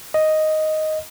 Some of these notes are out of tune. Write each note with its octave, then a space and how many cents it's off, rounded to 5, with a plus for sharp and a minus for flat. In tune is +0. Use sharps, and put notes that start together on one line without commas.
D#5 +0